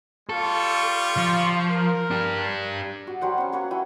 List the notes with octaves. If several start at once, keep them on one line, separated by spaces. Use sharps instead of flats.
G3 F4 A4 C#6
F3
A#4
D4 G4
F#4
F#3 G3 C5 F#5
C#4 C#6
A#3 F#4 B4 C#5
F#3 E4 G5 G#5